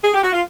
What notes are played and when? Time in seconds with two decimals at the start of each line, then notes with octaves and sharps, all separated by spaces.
0.04 G#4
0.14 G4
0.24 F#4
0.33 F4